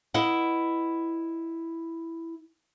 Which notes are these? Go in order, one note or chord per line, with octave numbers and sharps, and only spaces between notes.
E4 B4 D#5 F#5